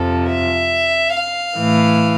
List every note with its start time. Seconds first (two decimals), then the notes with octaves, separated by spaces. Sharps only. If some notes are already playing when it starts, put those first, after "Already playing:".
Already playing: F2 C3 F3 A4
0.28 E5
1.14 F5
1.58 A2 E3